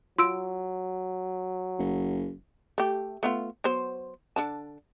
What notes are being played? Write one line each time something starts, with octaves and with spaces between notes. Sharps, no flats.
F#3 F4 E6 D7
F#1
A3 G4
A3 B3 F4
F#3 B3 C5
D3 D4 A5